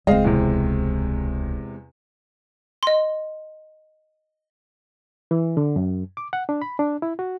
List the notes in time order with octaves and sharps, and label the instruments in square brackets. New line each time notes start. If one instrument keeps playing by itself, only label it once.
[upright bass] D#1 C#2 [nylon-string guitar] G#3 C4 [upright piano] D#5 F5
[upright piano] E2 C3
[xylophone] D#5 C6
[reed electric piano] E3
D3
F#2
D6
F#5
D4
B5
D4
E4
F#4